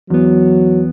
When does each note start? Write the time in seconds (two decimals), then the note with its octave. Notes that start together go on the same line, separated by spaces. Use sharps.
0.10 E2 F#3 B3